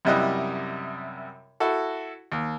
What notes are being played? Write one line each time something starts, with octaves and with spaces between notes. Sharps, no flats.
F#2 C3 G3 E4 D#5 F#6
E4 F#4 A4
D#2